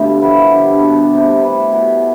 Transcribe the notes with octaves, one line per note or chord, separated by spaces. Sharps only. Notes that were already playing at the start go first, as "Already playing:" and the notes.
Already playing: B2 D3 G3 A3 D4 F4
F3 B3 E4 B4
D3 G3 D4
B2 B3 D4 A4
C3 G3 C4 E4
A3 E4 B4 E5
B2 G3 B3 E4